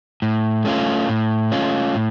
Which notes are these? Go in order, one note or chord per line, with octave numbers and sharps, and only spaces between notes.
A2
A3 C#4 F4
A2
A3 C#4 F4
A2